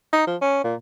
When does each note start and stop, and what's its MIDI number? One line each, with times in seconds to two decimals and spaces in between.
0.13 0.26 63
0.27 0.36 53
0.41 0.64 61
0.64 0.75 46